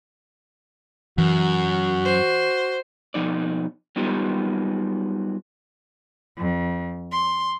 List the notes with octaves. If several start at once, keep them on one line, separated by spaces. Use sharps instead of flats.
F#2 E3 F#4
C5
B2 F3 D#4 D5
F#3 G3 B3 D#4 F4 G4
F2
C6